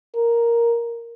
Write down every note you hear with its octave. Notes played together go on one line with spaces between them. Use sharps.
A#4